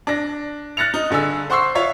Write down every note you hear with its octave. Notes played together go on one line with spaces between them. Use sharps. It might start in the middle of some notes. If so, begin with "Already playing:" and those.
D4 A#6
F6 F#6 A6 A#6 C#7 F7
D#4
G2 D3 G#4 E6
C5 F#5 C6 C#6 E6 C7
F4 C#5 E5